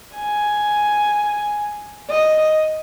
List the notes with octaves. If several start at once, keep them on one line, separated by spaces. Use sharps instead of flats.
G#5
D#5